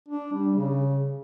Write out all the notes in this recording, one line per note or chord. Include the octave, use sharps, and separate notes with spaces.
D4
G3
C#3